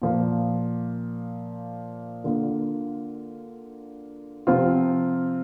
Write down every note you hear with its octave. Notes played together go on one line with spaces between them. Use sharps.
A#2 F3 A#3
D3 A#3 F4
C3 F3 C4 F4